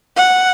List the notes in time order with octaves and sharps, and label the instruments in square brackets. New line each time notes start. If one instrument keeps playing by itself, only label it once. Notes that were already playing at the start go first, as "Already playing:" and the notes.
[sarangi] F#5